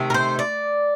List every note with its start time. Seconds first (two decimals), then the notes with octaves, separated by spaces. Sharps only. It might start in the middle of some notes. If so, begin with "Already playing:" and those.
Already playing: C3 D#3 A3
0.10 A#4
0.14 C5
0.39 D5